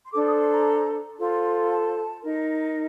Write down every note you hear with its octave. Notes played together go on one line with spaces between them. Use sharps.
C6
D4 A4 C5 D6
D#6
C6
A#5
F4 A4 C5
A5
D#4 A#4